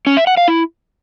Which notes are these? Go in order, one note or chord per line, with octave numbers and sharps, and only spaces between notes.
C#4
E5
F#5
F5
E4